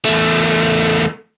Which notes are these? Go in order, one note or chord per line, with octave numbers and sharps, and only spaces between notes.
E2 A3